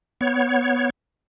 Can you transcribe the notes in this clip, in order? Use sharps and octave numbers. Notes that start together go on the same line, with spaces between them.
B3 C#5